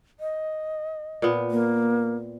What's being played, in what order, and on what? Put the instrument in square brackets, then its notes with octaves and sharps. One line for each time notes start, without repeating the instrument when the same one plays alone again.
[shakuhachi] D#5
[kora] A#2 B3
[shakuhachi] A#3